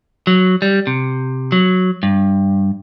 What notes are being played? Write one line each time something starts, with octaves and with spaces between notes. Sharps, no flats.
F#3
G3
C3
F#3
G2